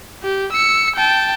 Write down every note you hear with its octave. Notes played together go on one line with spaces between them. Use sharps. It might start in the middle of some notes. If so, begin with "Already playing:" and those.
G4
E6 C#7
G5 A5